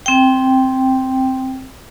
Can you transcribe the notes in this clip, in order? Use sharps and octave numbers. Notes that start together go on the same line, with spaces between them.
C4 G5